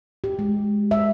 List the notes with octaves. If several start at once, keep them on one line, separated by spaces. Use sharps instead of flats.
G4
G#3
E5